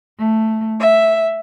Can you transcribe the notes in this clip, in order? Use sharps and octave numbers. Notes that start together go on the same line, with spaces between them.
A3
E5